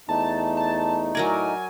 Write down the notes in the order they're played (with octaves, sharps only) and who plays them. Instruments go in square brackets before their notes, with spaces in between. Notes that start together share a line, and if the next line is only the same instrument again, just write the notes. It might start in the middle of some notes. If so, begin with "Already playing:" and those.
[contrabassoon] E2 [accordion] A3 D#4 [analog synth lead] A5
[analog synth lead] A5
[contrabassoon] A2 [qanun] F#3 A#4 D5 [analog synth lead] G#5